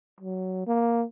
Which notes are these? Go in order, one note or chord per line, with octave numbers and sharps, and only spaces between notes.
F#3
A#3